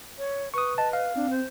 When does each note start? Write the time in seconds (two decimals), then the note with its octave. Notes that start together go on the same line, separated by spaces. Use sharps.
0.18 C#5
0.54 B4 C#6 D#6
0.78 D#5 A5
0.93 F5
1.15 C4 D4
1.30 C5